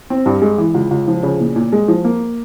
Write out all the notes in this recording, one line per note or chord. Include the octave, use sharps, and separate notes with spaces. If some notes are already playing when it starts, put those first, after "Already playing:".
C4
G2
G#3
E3
C#2
C#2
F3
C#3
A#2
A#2
G#3
F3
A#3